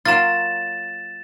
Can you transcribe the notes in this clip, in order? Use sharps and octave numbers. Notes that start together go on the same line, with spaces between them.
F#3 A#3 F4 A6 E7